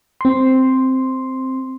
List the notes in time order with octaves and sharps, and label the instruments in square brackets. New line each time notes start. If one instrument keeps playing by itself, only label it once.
[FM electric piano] C4 C6